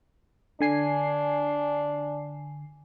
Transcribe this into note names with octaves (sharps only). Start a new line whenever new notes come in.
D3 D4 G#5 C7